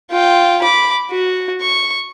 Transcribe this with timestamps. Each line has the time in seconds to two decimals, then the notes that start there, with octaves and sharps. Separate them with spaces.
0.11 F4 G5
0.62 B5 D6
1.11 F#4
1.61 C#6